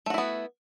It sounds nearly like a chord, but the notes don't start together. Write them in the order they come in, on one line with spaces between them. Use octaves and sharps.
A3 F#4 E4 B3